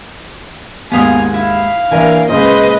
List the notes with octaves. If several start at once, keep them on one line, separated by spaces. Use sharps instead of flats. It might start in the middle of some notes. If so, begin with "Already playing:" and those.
D#2 G#2 B3 F5 G#5 D#6
E4 F5
E3 A#3 D4 A#4 E5 G#5
A#2 C#3 G#3 B4 C5 D#5